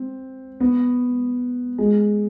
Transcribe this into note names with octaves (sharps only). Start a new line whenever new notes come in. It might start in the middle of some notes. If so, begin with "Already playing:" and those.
Already playing: C4
B3
G#3